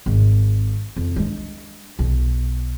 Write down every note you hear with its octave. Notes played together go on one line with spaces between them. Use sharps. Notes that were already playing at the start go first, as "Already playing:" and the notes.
G#1
F2
G#3 D4
B1